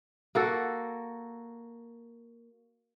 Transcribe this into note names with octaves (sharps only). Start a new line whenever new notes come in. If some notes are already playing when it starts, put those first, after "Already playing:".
A#3 F#4 A4